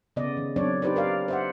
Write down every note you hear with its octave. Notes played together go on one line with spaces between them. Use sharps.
C#3 B3 D5 D#5
D#3
F#3 C4 D4 C#5 D5
D#4 G4 B4 C5 D5
A#4 D5 F5
C5 E5 F#5